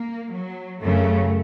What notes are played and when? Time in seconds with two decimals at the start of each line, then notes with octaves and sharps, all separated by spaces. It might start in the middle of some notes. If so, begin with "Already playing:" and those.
Already playing: A#3
0.33 F#3
0.81 F#2 C#3 A3